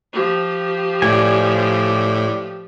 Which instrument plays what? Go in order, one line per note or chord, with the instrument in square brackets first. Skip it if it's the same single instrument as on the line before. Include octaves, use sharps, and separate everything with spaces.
[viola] F3 G4
[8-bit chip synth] A2 [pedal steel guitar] D5 G#5